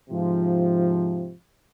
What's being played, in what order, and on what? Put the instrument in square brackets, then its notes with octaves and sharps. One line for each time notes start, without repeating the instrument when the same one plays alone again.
[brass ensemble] G#2 C3 F3